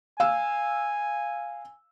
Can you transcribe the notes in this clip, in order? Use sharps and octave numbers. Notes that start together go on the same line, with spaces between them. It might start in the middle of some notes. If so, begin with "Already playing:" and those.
F5 G#5 E6